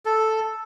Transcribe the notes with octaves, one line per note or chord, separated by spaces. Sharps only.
A4